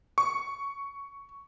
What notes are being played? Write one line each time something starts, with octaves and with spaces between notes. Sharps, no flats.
C#6